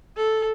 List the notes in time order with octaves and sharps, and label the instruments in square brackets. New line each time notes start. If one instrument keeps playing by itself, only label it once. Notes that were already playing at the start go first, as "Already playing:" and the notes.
[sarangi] A4